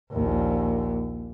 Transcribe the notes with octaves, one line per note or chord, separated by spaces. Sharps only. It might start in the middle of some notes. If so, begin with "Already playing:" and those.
A#1 D#2